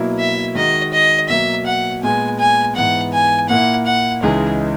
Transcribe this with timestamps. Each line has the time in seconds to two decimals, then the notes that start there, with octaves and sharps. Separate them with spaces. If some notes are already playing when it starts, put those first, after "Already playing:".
Already playing: B2 F#3 A#3 E4
0.19 E5
0.55 D#3 G#3 D#4 F#4 D#5
0.93 D#5
1.29 B2 F#3 A#3 E5
1.66 F#5
2.03 A#2 G#3 B3 G#5
2.39 G#5
2.76 G#2 E3 B3 F#5
3.13 G#5
3.49 A#2 A#3 E4 F#5
3.86 F#5
4.23 C#2 C#3 E3 G#3 D#4 G#4